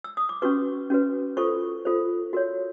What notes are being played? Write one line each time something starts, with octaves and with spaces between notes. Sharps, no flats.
E6
D#6
D6
C#4 F#4 B4 C#6
C#4 F#4 B4
F4 A4 C5 C#6
F4 A4 C5
F#4 A#4 C#5